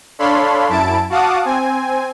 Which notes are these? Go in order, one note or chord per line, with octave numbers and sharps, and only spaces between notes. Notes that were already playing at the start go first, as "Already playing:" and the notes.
D4 A4 C#5 F5 B5 C6
F#2 E4 A5 D7
F#4 F5 F#5 A5 D6 D#6
C4 G#5